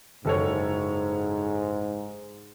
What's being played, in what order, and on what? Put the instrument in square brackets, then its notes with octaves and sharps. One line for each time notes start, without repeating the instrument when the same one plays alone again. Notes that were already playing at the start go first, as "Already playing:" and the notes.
[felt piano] F#1 A4 C#5 [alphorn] G#2